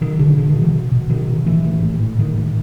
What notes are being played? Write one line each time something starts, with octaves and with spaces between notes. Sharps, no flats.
B2 D#3
B2 D3
B2 D3
D#3
B2
E3
B2
B2
B2 D#3
B2
A2 E3
A2
A2
A2
A2 D#3
A2